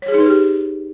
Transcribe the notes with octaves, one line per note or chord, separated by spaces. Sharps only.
C#5
G#4
D#4
B4
G4